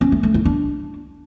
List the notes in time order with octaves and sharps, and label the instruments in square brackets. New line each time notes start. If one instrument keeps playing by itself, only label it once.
[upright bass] C#4
A3
A3
E4
D4